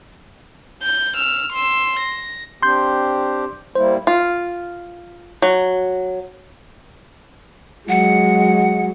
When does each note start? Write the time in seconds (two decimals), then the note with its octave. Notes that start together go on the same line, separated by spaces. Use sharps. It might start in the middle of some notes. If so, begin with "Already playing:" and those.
0.83 G6
1.16 E6 F6
1.53 C6 E6
2.00 A#6
2.63 C4 D4 G4 C6 G6
3.75 G3 A#3 E4 C5
4.07 F4
5.42 F#3
7.89 F#3 G#3 F#5